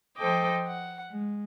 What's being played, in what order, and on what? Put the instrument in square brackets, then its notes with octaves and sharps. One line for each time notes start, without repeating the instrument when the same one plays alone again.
[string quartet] F3 A4 C5 D#5 G5 D6
F#5
G#3